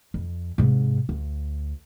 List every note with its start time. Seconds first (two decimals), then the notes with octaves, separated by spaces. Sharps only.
0.14 F2
0.58 G#2 C3
1.09 D2